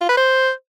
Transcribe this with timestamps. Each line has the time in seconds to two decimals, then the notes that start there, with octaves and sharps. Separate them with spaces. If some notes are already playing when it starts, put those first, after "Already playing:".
0.01 F4
0.09 B4
0.17 C5